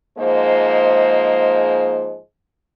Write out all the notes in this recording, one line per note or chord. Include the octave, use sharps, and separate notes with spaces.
G#2 F3 G#3 A#3 C5 D#5